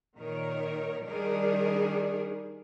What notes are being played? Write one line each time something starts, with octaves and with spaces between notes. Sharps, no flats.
A#2 D#3 A#4 C#5
D#3 G3 D4 G#4 A#4